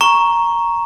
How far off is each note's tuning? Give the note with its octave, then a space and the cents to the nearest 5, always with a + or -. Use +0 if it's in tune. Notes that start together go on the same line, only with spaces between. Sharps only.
A#5 +5 C#6 +0